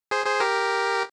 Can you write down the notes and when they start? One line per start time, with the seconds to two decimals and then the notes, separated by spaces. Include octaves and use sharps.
0.11 G#4 C5
0.26 G#4 C5
0.40 G4 A#4